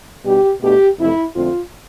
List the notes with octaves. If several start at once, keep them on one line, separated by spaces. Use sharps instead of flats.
B2 G3 D4 G4
B2 A3 D4 G4
F2 C3 E3 A3 E4
F2 D3 A3 C4 F4